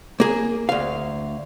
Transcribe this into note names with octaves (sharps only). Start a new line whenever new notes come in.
A#3 G#4
D2 F5